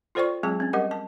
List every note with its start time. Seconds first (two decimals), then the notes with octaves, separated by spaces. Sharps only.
0.15 F4 A4 C5 D5 G5 C#6
0.43 F#3 G#3 C4 G#4 A5
0.60 C4 C#4
0.73 G3 G4 A#4 D#5 F#5
0.91 A5